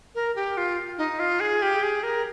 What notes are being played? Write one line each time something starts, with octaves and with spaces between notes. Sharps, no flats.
A#4
G4
F4
D#4
F4
G#4
G4
G#4
A#4